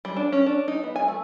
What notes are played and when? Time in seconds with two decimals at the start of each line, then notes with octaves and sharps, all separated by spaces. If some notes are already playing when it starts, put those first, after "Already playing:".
0.05 G3
0.16 D4
0.32 C#4
0.46 D4
0.68 D#4
0.84 B3
0.96 G#5
1.08 A3